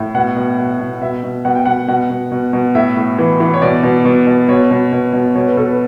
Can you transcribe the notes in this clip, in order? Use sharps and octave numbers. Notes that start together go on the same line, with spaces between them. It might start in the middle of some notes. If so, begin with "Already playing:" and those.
Already playing: A2
B2 F#5
B2
B2
B2
B2 E5
B2
B2 F#5
G5
B2 F#5
B2 F#5
B2
B2
B2
A2 E5
A2
E3
E3
C#5
B2 D5
B2
B2
B2
B2 C#5
B2
B2
B2
B2 C#5
B4
B2 A4
B4